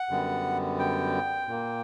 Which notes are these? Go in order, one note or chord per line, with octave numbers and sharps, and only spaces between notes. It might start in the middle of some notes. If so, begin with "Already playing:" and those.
Already playing: F#5
F#2 D3 G3 B3
G5
A#2 A#3